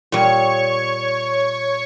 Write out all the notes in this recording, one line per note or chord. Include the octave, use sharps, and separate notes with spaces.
A#2 G3 C#5 C#6